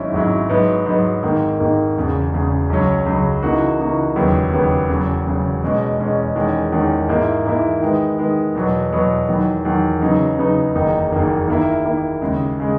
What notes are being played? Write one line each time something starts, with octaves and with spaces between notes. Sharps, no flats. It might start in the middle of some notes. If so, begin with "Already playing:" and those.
Already playing: G#1 G#2 F#3 C#4 E4
G#1 G#2 F#3 C#4 E4
G#2 F#3 B3
G#2 F#3 B3
G#1 G#2 D#3 A#3
G#1 G#2 D#3 A#3
E1 E2 C#3
E1 E2 C#3
C#2 C#3 F#3 C#4
C#2 C#3 F#3 C#4
C#3 E3 A#3 D#4 F#4
C#3 E3 A#3 D#4 F#4
E1 D#2 C#3 F#3 B3
E1 D#2 C#3 F#3 B3
E1 E2 C#3 F#3
E1 E2 C#3 F#3
E2 B2 G#3 C#4
E2 B2 G#3 C#4
E2 D#3 G#3 C#4
E2 D#3 G#3 C#4
G#2 E3 A#3 E4
G#2 E3 A#3 E4
D#3 G#3 B3
D#3 G#3 B3
E2 B2 F#3 B3
E2 B2 F#3 B3
E2 D#3 F#3
E2 D#3 F#3
C#3 F#3 B3 D#4
C#3 F#3 B3 D#4
F#1 E2 D#3 A#3 D#4
F#1 E2 D#3 A#3 D#4
D#3 A#3 E4
D#3 A#3 E4
D#2 C#3 G#3
C#3 G#3